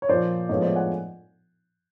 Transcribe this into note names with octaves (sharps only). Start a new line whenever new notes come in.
C#5
A#2 F3 A#3 C5 D5
A2 F3 G#3 B3 C#5 D#5
C5 D5
F#5 G#5